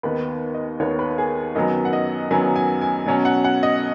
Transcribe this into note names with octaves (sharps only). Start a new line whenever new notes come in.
D#2 D#3 B3 B4
D#5
D#2 D#3 B3 C#5
B4
G#4
F#2 D#3 F#3 B3 D#5
F#5
D#5
F#2 D#3 F#3 B3 G#5
G#5
G#5
B2 F#3 C#4
F#5
F#5
D#5